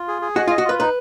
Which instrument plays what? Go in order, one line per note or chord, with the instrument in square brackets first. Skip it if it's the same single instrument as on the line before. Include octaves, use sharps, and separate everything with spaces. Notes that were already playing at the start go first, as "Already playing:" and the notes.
Already playing: [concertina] F4
G#4
G#4
[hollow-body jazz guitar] F#4 [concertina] D#5
[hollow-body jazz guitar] F4
[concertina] D#5
[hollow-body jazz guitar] F#4
[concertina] F4 [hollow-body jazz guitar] B4
[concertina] D#4 [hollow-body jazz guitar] B4